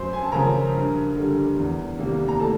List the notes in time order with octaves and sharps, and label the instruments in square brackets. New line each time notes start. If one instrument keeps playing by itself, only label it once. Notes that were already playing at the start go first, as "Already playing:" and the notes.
Already playing: [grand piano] F#2 C5 C6
G#5
A5
C#3 F3 A#4 A#5
G2
D3 G3
E2
C3 D#3 G3 A#3
A#5
A2 A4 A5